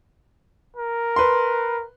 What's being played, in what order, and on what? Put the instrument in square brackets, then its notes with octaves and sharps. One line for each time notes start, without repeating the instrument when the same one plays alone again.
[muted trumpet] A#4
[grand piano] B4 C6